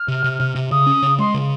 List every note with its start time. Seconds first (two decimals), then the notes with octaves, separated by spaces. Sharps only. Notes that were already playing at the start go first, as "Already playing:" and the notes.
Already playing: F6
0.08 C3
0.24 C3
0.40 C3
0.55 C3
0.71 C#3 D#6
0.86 C#4
1.02 C#3
1.19 G#3 C6
1.34 C#3